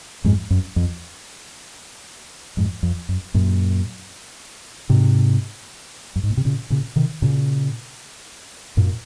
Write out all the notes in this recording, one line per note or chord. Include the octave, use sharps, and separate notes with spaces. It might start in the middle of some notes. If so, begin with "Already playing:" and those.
F2 G#2
F#2
F2
F2 G#2
F2
F#2
F#2 A#2
G#2 C3
F#2
G#2
A#2
C3
A#2 C#3
A#2 C#3
C3 D#3
A#2 C#3
F#2 A#2